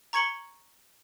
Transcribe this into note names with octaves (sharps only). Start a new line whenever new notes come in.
A#5 C#6 G#6 C#7 F#7 G7